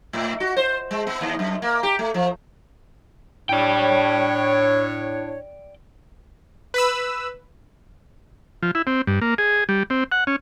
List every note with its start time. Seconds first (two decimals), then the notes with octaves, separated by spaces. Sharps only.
0.13 A2
0.40 F#4
0.57 C5
0.91 G#3
1.07 B3
1.21 D#2
1.39 F#2
1.62 A#3
1.83 G4
1.99 A3
2.14 F3
3.49 A2 D4 C#5 D5 G5
6.74 B4 B5 E6
8.63 F3
8.75 E4
8.87 C4
9.07 G2
9.21 A#3
9.38 G#4
9.69 G3
9.90 C4
10.12 F#5
10.27 C#4